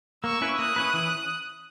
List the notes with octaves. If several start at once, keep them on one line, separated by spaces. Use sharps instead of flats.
A#3 C#6 E6
C#4 E4 B4
A#3 D#6 F#6
C#4 E4 B4
E3